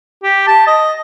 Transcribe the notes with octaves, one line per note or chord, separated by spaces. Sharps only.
G4
A5
D#5